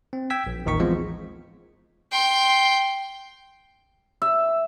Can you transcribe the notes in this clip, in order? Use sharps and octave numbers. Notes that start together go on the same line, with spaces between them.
C4
G5 E6 G#6 B6
A#1
A1 D#2 D#3 D#4 C#6 B6
E3 F3 G#3 B3 C4 F4
G5 C6
E5